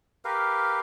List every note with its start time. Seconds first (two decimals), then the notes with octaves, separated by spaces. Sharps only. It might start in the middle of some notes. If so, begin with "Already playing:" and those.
0.25 G4 A#4 B4 F5